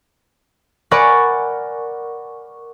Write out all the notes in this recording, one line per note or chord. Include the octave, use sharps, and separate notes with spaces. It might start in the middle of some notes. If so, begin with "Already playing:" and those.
A#4 D5 F#5 G#5 B5 C#6